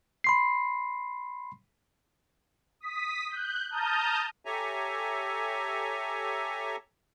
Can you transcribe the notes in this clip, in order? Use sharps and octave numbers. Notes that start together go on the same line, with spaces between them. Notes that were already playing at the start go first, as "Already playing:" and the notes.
B5 C6 C7
D#6 B6
F#6 G6
A5 A#5 D#6 F6 G6
G4 A4 C#5 E5 G#5 A#5